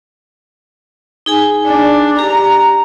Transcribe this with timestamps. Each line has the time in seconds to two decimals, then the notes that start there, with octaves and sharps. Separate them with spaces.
1.26 D#4 G#4 G#5
1.66 D4
2.19 G4 A#5